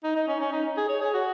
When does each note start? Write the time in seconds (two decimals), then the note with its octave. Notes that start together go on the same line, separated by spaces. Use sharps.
0.04 D#4
0.16 D#4
0.28 C#4
0.40 C#4
0.52 D#4
0.77 G#4
0.89 C#5
1.01 G#4
1.14 F#4